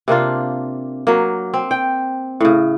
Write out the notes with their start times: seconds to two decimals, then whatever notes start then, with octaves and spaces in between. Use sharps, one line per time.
0.08 C3 A#3 D4 F4
1.07 F#3 A#3
1.54 C4
1.71 G5
2.40 A2 C#3